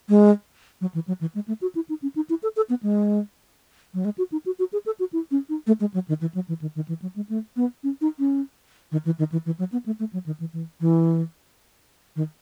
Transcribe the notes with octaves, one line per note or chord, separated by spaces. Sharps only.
G#3
F#3
E3
F#3
E3
G#3
A3
F#4
E4
D#4
C#4
D#4
E4
A4
A4
B3
G#3
F#3
G#3
F#4
D#4
F#4
F#4
G#4
A4
F#4
E4
C#4
D#4
A3
G#3
F#3
D#3
E3
F#3
E3
D#3
D#3
E3
F#3
G#3
A3
B3
C#4
D#4
C#4
D#3
E3
D#3
E3
E3
F#3
B3
A3
A3
F#3
D#3
E3
E3
E3
D#3